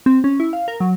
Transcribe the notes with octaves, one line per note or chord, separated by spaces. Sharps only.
C4
C#4
E4
F5
A#4
F#3